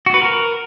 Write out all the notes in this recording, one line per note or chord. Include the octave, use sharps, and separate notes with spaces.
F#4
B4
A#4